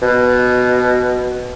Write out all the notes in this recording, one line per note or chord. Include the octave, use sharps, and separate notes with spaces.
B2